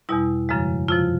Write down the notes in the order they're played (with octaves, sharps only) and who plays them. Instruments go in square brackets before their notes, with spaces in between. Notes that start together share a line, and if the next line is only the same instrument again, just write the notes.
[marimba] E2 B2 G3 E4
F#2 C#3 F3 G#3
F2 C3 F3 F4